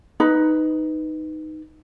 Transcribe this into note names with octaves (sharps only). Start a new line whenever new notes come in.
D#4 B4